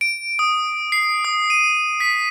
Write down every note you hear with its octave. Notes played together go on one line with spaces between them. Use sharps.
D7
D#6
C7
D#6
D#7
B6